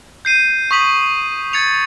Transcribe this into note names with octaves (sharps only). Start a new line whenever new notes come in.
G6 C7 D#7
C#6 D#6 B6 F#7
G#6 A6 C#7 F7